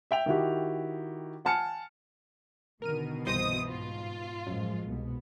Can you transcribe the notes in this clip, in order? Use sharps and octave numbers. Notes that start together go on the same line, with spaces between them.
E5 G5 F7
D#3 E4 F#4 G4
F#5 G#5 A5 F6 C#7
B2 D3 D#3 A#4 F6 D#7
C2 G2 E3 C5 D#5 D#6
G#2 F4
A1 F#2 F3 G#3
C2 B2 B3